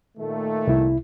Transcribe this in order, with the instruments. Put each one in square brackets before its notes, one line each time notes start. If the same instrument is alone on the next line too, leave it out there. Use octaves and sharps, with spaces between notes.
[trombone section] A#2 D#3 A3
[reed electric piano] C2 E4